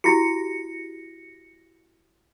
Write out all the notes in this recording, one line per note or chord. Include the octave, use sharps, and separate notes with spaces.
E4 F#4 G4 A#6 C#7